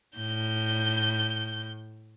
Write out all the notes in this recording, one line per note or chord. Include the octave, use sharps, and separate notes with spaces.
A2 G6